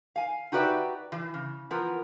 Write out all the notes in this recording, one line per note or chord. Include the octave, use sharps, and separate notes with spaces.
F5 G#5
D#4 F#4 G4 B4 D5 E5
E3
C#3
E3 F3 B3 A#4